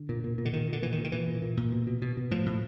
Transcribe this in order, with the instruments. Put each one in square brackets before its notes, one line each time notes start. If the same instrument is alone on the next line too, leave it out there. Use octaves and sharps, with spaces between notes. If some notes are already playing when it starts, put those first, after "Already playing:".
Already playing: [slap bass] D3
A#2
A#2
A#2
D3
A#2 D#3
A#2
D3
A#2 E3
D#3
A#2
D#3
A#2 E3
A#2
A#2
A#2
B2
B2
B2
B2
A2 F3
A2